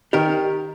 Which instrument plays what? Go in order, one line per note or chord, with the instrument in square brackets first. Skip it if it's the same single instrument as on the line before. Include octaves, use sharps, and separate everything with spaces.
[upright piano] D#3 [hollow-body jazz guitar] G4 A#4